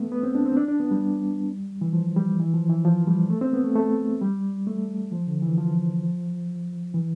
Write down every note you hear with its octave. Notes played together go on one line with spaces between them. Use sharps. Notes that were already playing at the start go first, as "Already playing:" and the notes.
Already playing: A3 B3
B3
C4
D4
C4
D4
D4
B3
G3
E3
F3
G3
E3
F3
E3
F3
G3
A3
C4
B3
A3
A3
G3
A3
F3
D3
E3
F3
E3